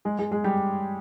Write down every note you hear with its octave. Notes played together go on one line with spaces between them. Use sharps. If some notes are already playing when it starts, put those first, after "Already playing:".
G#3 G#4
G#3 G#4
G#3 G#4
G3 G4